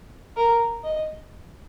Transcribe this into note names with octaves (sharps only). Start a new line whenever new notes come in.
A#4
D#5